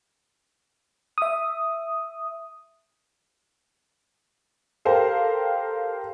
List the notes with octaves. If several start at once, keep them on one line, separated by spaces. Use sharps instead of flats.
E5 D#6
G4 A4 A#4 C5 F5